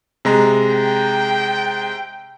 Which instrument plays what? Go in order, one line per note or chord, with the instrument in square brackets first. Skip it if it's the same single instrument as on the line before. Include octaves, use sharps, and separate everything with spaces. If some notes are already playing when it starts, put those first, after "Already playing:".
[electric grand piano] C3 G#3 A#5
[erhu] G5